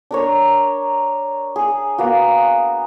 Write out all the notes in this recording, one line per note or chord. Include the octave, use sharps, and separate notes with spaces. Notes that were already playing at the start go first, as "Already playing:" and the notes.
D4 A#4 C#5
G#4
A#3 B3 F#4